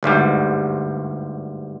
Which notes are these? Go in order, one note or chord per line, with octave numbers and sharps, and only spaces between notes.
G1 D2 G#2 G3